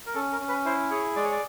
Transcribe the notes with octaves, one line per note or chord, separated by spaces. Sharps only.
A#4
C#4 A4
A#4
C#4
B4
E4 C5
G#4 C#5
G#3 D5
C#5
D5